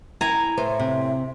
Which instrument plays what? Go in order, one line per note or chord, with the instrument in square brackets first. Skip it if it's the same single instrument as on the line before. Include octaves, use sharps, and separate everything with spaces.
[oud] E4 [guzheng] G#5 A#5
[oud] A2 B4 C5 [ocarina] E5
[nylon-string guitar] C3